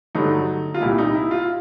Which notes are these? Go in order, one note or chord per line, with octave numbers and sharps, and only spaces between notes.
G2 D3 F#3 A3 D#4
F4
C2 A#2 G3 E4
D#4
E4
F4